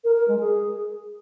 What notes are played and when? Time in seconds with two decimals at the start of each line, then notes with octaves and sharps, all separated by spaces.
0.04 A#4
0.16 A#4
0.28 G#3
0.39 G#4